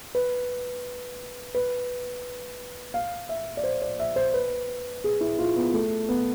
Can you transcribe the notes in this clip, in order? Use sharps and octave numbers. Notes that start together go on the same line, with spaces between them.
B4
B4
F5
E5
D5
C5
D5
E5
C5
B4
G#4
E4
F4
B3
A3
B3